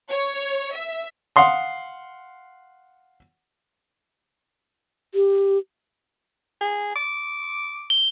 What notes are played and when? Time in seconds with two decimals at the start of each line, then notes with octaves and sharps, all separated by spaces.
0.11 C#5
0.75 E5
1.36 F5 F#5 C6 D#6
5.15 G4
6.61 G#4
6.96 D6
7.90 G7